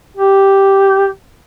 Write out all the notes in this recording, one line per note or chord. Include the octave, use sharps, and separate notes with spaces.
G4